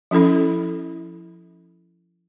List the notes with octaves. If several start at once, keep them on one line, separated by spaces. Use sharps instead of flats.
F3 C#4 E4 A4 B5